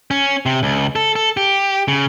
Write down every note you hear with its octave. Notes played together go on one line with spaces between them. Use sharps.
C#4
C3
C#2
A4
A4
G4
C#3